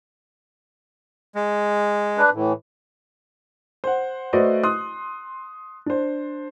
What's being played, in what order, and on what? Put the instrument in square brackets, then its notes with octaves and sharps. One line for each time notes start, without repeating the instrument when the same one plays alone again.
[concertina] G#3
[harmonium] D4 B4
A2 E3
[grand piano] C5 F#5
A3 F#4 B4 C5 D5 D#5
C6 D#6 F#6
D4 C5